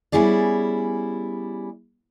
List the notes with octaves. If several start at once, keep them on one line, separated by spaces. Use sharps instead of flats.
G3 B3 C#4 E4 G#4 D5